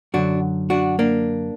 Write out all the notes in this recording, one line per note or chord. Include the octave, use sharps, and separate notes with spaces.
F#2 D3 F#3 D4 F#4
D4 F#4
A#3 D4